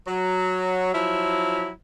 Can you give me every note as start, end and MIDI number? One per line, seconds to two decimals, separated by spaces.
0.07 0.90 54
0.94 1.68 53
0.94 1.68 54
0.94 1.68 64